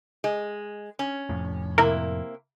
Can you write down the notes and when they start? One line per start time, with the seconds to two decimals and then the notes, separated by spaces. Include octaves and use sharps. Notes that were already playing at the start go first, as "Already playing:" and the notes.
0.24 G#3
0.99 C#4
1.29 F1 F2 A2
1.78 C3 A#3 E4 A#4